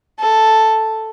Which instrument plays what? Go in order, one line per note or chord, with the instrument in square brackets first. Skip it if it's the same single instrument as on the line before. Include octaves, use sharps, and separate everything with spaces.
[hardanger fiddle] A4